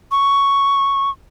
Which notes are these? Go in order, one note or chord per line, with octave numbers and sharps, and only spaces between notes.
C#6